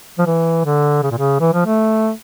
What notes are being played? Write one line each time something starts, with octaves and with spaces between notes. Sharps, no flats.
F3
E3
D3
C#3
A#2
C#3
E3
F3
A3